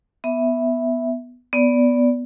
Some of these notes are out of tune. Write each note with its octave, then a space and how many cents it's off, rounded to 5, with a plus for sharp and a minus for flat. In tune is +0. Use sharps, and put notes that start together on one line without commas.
B3 +0 E5 -5
B3 +0 D5 -15